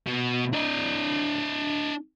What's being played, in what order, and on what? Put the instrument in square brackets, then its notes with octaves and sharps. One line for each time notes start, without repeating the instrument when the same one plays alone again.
[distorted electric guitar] B2
D4 D#5